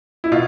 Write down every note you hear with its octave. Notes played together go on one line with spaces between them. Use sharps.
E4
B2 D#4 F4